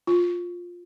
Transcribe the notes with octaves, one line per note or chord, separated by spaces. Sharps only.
F4